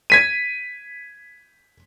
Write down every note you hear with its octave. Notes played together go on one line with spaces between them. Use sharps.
G#6 B6 D#7